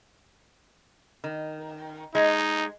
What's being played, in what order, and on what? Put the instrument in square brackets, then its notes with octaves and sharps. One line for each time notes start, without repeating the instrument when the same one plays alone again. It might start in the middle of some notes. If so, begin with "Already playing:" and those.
[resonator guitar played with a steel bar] D#3
[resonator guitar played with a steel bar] G#3 [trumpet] D#4